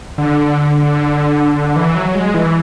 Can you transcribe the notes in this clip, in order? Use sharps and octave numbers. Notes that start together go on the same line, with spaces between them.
D3
E3
F#3
G#3
E3